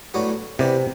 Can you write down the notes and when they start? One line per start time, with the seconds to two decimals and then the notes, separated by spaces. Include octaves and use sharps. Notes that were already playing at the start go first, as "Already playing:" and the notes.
0.14 A2 F#3 B3 D4 F#4
0.59 C3 E3 B3 D4 G4